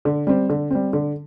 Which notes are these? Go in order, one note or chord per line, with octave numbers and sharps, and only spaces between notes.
D3
G3 C4
D3
G3 C4
D3